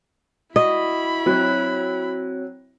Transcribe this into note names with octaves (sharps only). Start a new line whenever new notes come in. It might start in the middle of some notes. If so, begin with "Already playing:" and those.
E4 F#4 D#5 B5 C#6
F#3 C4 C#5 F#6